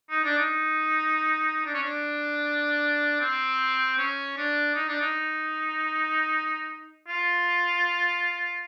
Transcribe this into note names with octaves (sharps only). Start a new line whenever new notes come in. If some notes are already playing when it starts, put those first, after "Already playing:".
D#4
D4
D#4
D4
C#4
D4
C4
C#4
D4
D#4
D4
D#4
F4